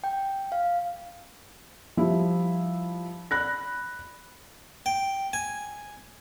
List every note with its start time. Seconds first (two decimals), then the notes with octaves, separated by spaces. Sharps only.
0.04 G5
0.52 F5
1.97 F3 G3 E4
3.31 D5 B5 F#6 A#6
4.86 G5
5.33 G#5